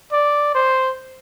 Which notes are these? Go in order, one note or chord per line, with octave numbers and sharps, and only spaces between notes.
D5
C5